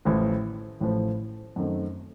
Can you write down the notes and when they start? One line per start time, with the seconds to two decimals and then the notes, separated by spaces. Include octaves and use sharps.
0.05 A1 A2 F3
0.81 A1 A2 F3
1.56 F#2 D#3 A3 C4